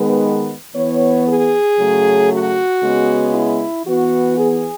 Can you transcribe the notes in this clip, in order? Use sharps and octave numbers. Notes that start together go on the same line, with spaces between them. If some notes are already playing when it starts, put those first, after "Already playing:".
Already playing: D#3 G#3 B3
E3 B3 C#5
G#4
C#3 F#3 A3
F#4
C#3 G#3 B3
E4
E3 B3 F#4
G#4